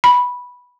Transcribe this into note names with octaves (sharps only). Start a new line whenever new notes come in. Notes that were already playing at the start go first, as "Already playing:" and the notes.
B5